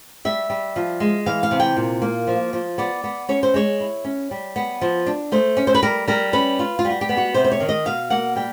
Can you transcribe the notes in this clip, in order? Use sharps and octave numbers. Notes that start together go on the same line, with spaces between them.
G3 E5
G3
F3
G#3
E3 F5
F5
C3
G5
A#2
A#3
F3
F3
B3 D5
B3
C#4 C#5
C5
G#3 C#5
E4
C#4
G3
B3
F3
D4
A3 C5
C#4
C5
B4
G3 A#4
G3 A#4
C#4 B4
F4
F4
G3
F#4
G4
B3
F#4
C3 C5
C5
C#5
D#3
D#5
B2 F5
A#3 F#5
G3 G5